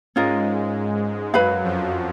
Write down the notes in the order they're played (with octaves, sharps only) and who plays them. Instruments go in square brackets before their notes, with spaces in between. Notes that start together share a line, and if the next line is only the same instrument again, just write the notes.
[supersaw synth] G#2 G#3 [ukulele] C#4 F4 A#4 D#5
[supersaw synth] F#2 F#3 [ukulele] B4 F5 B5
[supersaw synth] F2 F3